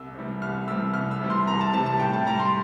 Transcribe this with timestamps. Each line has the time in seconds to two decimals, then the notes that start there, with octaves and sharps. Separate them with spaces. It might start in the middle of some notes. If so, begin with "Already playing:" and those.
Already playing: C2 E6
0.15 C3 E3 G3
0.42 C2 F6
0.68 C3 E3 G3 E6
0.94 C2 F6
1.11 E6
1.21 C3 E3 G3
1.30 C6
1.47 C2 A#5
1.61 A5
1.73 C3 E3 G3 A5
1.86 A5
2.00 A2 G5
2.13 A5
2.27 G3 A#5
2.40 C6